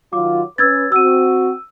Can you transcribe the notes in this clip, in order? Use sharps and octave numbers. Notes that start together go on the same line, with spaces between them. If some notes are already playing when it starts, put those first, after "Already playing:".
D#3 F#3 F4 D6
C#4 B4 E6 G#6 A6
C4 F#4 E6 D#7